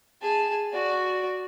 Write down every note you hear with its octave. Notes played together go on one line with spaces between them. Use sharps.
G#4 A5
F#4 D5